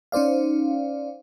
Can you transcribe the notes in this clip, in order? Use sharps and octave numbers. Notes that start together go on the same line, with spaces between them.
C#4 D#4 C5 D5 F5